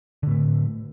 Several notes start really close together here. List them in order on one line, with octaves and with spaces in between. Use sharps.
D3 A2 A3